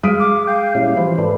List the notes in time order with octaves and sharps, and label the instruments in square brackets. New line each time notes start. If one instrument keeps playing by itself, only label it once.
[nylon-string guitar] G#3 [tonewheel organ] F5 [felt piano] D#6 B6 D7
[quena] D6
[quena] F5 [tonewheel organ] G5
[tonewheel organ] A#2 C#4 E4 [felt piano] G3
[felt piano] E3 E4 C5 [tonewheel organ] F3
[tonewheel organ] G#2 A4 B4 [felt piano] D5